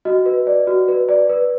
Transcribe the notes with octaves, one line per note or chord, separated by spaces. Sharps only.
F#4 D#5
B4
D5
F#4
B4
D5
B4